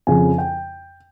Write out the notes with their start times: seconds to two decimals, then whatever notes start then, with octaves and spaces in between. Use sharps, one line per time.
0.07 F2 C#3 F3 C4 G#5
0.38 G5